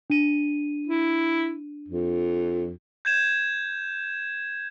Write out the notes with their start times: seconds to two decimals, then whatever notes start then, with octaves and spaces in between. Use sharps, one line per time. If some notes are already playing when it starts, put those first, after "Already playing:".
0.10 D4 D#7
0.87 E4
1.88 F2
3.05 G6 G#6 E7